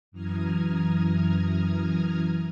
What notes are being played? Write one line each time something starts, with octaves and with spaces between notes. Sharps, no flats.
F#2 E3 A#5 D#6 F6 G#6